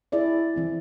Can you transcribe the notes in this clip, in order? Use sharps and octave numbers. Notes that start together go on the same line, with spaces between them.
E4 G#4 D5 E5
E3 C4